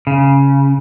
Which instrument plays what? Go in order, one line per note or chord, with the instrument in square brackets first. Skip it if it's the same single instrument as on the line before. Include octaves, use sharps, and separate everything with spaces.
[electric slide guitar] C#3